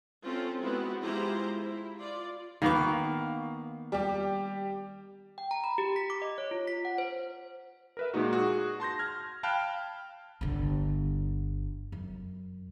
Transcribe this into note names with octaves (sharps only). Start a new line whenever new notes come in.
C4 C#4 F4 A4
G#3 B3 C4 E4 F#4
G#3 E4 F4 G4 C5 A#5
E4
F4 D5
D#3 A#3 B3 F5 C#6
G3 G4
G5
A#5
B5
G4
B6
D6
D#5
C#5
F4
B6
F#5
C5
A#4 B4 E5
A#2 G#3 A#3 D#4 F#4
F#4 G#4
A5 C6 G6 A#6
F6 G#6
F5 G5 A5 B5 F6 F#6
G1 D3
F#2